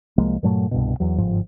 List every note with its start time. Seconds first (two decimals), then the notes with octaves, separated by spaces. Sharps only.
0.18 C2 F3 G#3 A#3
0.43 G2 A#2 F#3 A3
0.71 C2 G2 B2
1.00 E2 F#3
1.18 G1 G#2 F3